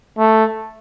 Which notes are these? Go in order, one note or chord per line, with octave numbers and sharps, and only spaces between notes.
A3